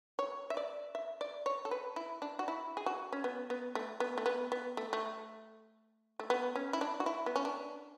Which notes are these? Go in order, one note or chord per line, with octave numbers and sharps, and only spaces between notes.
C#5
E5
D5
E5
D5
C#5
A4
B4
E4
D4
F#4
E4
G#4
F#4
C#4
B3
B3
A3
B3
A3
B3
B3
A3
A3
A3
B3
C#4
E4
D4
F#4
E4
B3
C#4
D4